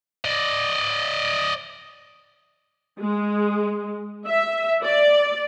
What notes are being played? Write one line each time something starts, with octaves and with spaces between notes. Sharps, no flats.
D5 D#5
G#3
E5
D5